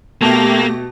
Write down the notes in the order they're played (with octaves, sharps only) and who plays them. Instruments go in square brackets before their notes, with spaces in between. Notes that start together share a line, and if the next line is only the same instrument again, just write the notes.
[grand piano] B2 A5 F7 [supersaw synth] A3 G4 A#6 [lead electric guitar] A#3